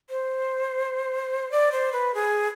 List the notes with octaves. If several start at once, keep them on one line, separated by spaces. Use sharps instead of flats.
C5
D5
C5
B4
G#4